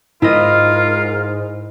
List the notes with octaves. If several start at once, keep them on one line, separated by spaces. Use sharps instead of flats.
G#2 E4 F4 A#4 D#5